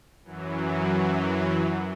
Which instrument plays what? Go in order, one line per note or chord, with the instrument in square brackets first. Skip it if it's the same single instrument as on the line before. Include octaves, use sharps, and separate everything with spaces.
[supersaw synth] F#2 E3 F#3